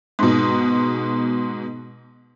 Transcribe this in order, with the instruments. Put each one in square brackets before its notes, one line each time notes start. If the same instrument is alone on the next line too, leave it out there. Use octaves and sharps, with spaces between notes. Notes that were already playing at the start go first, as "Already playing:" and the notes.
[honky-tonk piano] G#2 B2